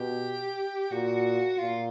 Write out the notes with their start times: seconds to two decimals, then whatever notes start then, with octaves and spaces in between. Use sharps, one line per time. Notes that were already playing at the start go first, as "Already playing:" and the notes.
Already playing: B2 G4
0.92 A#2 F#4
1.59 A#2 F4